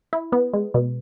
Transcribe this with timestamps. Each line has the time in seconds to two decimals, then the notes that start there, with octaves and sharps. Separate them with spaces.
0.13 E4
0.32 B3
0.54 G#3
0.74 B2